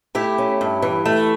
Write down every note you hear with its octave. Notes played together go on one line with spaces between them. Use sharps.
A3 E4 G4
C#4
G2
E3
A3